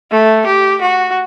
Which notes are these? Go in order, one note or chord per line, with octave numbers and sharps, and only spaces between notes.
A3
G4
F#4